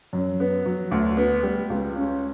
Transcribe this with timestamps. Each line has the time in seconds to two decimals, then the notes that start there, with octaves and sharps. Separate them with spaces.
0.13 F#2
0.40 B3
0.66 F#3
0.91 D2
1.17 B3
1.43 G3
1.70 C#2
1.95 C#4